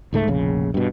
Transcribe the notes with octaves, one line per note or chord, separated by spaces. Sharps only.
C#2 G#2 A3
F1 A#1 C#3
G2 B2